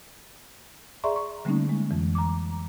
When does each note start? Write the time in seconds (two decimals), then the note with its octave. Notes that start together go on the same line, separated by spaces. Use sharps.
1.04 G#4 D5 E5 A#5 C6 C#6
1.16 C#6
1.45 D3 G3 A3 A#3 C#4 D#4
1.69 G#3
1.91 F2 E3
2.15 A#5 D6